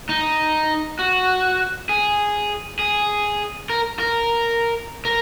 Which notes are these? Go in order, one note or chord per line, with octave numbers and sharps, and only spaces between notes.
D#4
F#4
G#4
G#4
A#4
A#4
A#4